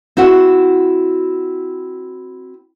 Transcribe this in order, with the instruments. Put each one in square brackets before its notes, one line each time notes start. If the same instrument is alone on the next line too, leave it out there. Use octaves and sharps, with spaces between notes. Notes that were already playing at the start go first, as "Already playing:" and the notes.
[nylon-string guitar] C4 E4 F#4 F#5